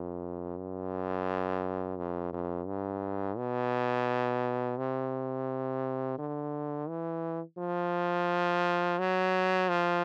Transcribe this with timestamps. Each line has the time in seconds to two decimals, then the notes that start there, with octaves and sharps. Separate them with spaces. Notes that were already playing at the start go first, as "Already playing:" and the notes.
Already playing: F2
0.57 F#2
1.97 F2
2.33 F2
2.67 G2
3.37 B2
4.78 C3
6.19 D3
6.89 E3
7.58 F3
8.99 F#3
9.69 F3